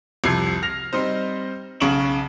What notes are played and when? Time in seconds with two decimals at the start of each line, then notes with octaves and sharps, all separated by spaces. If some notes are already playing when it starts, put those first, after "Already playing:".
0.24 C2 F2 C3 G#6 C7
0.62 F6 A#6 F7
0.93 G3 C4 D#4 C5
1.80 B1 C#3 C#6 D7 E7 F#7